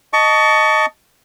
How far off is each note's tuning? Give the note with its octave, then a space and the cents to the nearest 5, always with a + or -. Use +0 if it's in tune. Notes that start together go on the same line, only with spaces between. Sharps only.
D#5 +0 A5 +0 C#6 +30